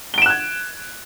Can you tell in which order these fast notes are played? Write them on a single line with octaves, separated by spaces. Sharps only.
G7 D7 E7 F#6 G#6